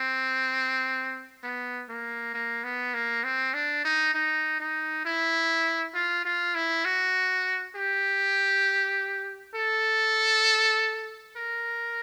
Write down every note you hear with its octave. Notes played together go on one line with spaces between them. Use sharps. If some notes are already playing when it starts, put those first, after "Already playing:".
Already playing: C4
B3
A#3
A#3
B3
A#3
C4
D4
D#4
D#4
D#4
E4
F4
F4
E4
F#4
G4
A4
A#4